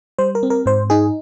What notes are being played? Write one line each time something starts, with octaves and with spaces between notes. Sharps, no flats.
G3 C5
A#4
C4
A#4
G#2 C5
D#4 G#4